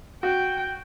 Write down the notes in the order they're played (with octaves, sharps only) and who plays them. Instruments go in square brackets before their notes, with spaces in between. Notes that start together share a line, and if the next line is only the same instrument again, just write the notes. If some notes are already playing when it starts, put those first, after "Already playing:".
[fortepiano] F#4 [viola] G5